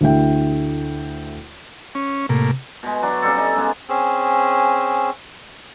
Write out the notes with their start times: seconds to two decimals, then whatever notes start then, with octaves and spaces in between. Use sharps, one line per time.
0.01 D2 D3 A3 E4 G5
1.95 C#4
2.29 A2 C3 A#3
2.83 B2 G#3
3.02 F#3 D4 F#4
3.22 C#3 G3 C4 A4
3.38 D#4
3.56 C#3 G#3 B3 G#4
3.89 C4 C#4 G#4 E6